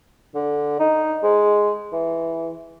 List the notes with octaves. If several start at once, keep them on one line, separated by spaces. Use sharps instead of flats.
D3
D#4
G#3
E3